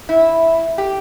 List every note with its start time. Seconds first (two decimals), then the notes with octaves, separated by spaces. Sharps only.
0.09 E4
0.78 G4